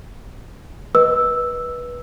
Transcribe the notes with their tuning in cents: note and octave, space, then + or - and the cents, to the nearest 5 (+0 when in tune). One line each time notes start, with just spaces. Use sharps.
B4 -20 D#5 +0 E6 +0